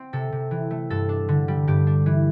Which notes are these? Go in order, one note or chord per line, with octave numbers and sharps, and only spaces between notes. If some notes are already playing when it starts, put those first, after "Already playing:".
Already playing: C4
C3 A4
C3
E3
A3
G2 A4
D4
D3
G3
G2 G4
D4
E3